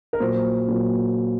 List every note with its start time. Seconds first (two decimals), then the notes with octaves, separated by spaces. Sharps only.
0.13 A#4
0.20 A#2 F#3 A#3 F4 C5
0.68 A#2 F#3 A#3 F4